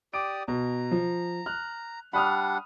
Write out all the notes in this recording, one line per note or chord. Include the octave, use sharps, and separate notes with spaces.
G4 D5 D#6 D7
B2 A#5
F3
F6 F#6
G3 D4 F#5 B5 D#6 F6